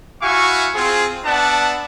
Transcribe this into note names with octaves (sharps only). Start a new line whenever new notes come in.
E4 F#4 E5 F5 G#5 C#6
C4 F4 G#4
B3 D4 D5 E5 F#5 A5